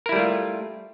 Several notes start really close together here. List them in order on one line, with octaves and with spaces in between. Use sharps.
A#4 E4 G3 A3 F4